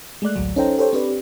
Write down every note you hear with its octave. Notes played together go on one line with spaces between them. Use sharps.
G#3 A3 D5 F#6
A1 D2 F#3
C#4 D#4 A4 C5 G5 A#5
G4 A4 C5 C#5 G5
C4 D4 G4 B4 D5